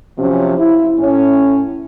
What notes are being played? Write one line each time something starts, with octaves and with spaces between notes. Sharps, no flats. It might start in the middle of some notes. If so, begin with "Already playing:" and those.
C3 F3 F#3 C#4
E4
A2 C#4